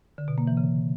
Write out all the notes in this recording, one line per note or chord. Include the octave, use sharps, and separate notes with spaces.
D3
B2
A#3
E3
C#3